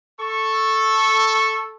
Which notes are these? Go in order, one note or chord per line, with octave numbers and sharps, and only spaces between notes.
A4 C#6